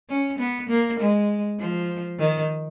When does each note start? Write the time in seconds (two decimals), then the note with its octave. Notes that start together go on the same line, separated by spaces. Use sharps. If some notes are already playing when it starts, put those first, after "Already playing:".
0.10 C#4
0.39 B3
0.69 A#3
0.99 G#3
1.59 F3
2.19 D#3